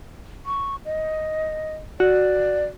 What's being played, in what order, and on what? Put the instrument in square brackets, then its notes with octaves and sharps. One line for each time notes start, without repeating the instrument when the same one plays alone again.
[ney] C#6
D#5
[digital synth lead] F#4 [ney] D5